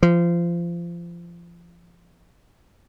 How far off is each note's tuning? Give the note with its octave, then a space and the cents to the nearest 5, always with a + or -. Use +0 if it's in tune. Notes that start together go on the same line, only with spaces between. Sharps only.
F3 -25